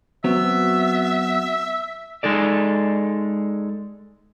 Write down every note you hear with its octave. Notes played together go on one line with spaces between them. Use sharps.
F#3 B3 C4 E5
G#3 D#4 A4 D5